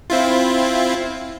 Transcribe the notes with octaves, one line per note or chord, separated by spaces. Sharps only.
C4 E4 F4